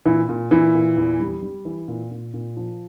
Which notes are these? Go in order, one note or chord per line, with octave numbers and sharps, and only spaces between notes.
A#2 E3 E4
A#2
A#2 E3 E4
A#2
E2
G3
G3
E3
A#2
A#2
A#2
F3